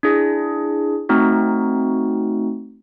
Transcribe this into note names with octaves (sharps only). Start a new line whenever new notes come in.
D4 E4 G#4
A3 C4 D#4 F#4